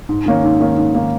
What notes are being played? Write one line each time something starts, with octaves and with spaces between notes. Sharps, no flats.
G#2
D#3 A#3 C#4
G#2
D#3 A#3 C#4
G#2
D#3 A#3 C#4